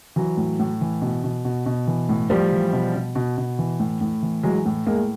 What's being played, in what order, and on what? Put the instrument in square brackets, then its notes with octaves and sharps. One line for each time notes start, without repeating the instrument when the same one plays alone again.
[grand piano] E3 F#3
A2
A2
E3
B2
B2
B2
B2
E3
A2
A2 F3 G3
E3
B2
B2
B2
B2
E3
A2
A2
E3
E3 F#3 G#3
A2
A2 G#3 A#3